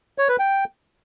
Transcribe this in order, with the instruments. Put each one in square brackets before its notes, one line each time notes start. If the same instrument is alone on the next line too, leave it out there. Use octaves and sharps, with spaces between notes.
[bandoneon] C#5
B4
G5